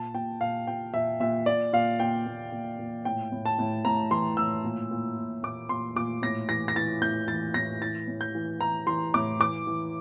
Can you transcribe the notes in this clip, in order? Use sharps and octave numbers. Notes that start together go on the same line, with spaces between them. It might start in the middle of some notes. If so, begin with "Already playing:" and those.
Already playing: A#2 A5
A#2 G5
A#2 F5
A#2 G5
A#2 E5
A#2 E5
A#2 D5
A#2 F5
A#2 G5
A#2
A#2
A#2
A2 G5
A2
A5
A2
A2 A#5
E3 C6
A2 E6
A#2
A#2
A#2
A#2 D6
A#2 C6
A#2 D6
A2 A#6
E3 A#6
A#6
E3 A6
A2 G6
E3 A6
A2 A#6
E3 A6
A2
G6
E3
E3 A#5
E3 C6
A2 D6
E3 D6
E3